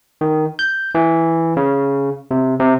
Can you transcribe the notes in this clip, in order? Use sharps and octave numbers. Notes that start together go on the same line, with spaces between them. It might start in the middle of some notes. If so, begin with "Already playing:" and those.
D#3
G6
E3
C#3
C3
C3